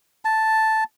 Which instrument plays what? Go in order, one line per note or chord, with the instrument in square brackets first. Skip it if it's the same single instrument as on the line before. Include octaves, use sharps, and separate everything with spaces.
[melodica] A5